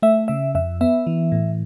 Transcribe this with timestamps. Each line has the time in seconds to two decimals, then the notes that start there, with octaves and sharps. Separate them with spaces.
0.02 A3 E5
0.28 C#3 E5
0.55 F2 E5
0.81 B3 E5
1.07 E3
1.32 A2